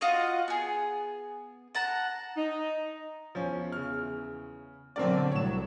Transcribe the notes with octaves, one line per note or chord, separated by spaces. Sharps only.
F4 F#4 D#5 F5
B3 G#4
F#5 A5 A#5
D#4
E2 F3 C#4
C#3 F6
B2 D3 F#3 C4 A#4 D5
C2 A2 F#3 C#5 E7